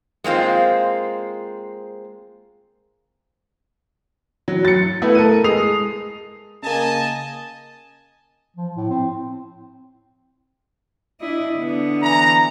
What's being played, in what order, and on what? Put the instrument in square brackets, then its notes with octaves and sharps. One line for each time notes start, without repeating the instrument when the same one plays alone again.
[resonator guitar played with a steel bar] G#3 A#3 C4 F4
[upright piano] F#3
A6 C#7
A3 B3 E4
A4 A#4 D#7
G#3 D#6 C7 F7
[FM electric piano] C#3 A#3 [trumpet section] D#5 G#5 A5
[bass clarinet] F3
A2
C4
[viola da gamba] D4 E4 D#5
D3 B3
[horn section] E3 A#5